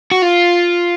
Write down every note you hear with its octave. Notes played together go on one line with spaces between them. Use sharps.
F#4
F4